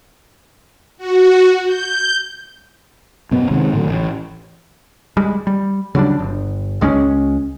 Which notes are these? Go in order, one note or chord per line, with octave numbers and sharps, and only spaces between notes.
F#4
G6
F#2 B2 B3
C3 D#3 G#3 C4
A2 D3 F#3
A1
G3 G#3
G3
C#3 F#3 G3 D4
G1
C#2 G#3 C4 C#4